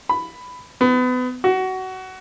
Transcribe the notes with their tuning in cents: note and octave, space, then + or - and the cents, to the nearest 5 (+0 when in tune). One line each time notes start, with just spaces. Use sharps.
B5 +10
B3 +30
F#4 +20